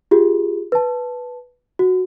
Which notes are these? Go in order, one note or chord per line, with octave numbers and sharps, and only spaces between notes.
F4 G4 G#4
B4 A5
F#4